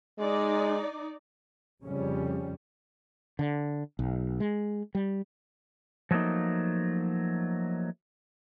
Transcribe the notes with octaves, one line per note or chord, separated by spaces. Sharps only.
G#3 D#4 D5
F1 F2 C#3 G3 C#4
D3
B1
G#3
G3
F3 F#3 A3 A#3 D#4